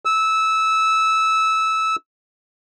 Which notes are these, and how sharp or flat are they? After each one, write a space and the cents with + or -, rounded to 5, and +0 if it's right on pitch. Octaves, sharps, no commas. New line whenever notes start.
E6 -15